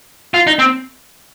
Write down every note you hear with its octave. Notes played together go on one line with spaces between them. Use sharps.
F4
D#4
C4